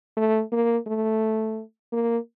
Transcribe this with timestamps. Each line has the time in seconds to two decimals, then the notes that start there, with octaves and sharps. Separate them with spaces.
0.17 A3
0.52 A#3
0.87 A3
1.93 A#3